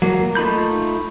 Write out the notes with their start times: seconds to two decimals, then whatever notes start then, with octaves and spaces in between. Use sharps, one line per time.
0.02 F#3 A#3
0.35 A3 D#4 F4 B5 G6